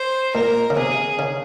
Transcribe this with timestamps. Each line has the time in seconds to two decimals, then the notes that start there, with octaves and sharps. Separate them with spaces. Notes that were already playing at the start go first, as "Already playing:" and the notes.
Already playing: C5
0.35 A#2 A#4
0.70 C#3
0.77 C3 G#4
1.19 C#3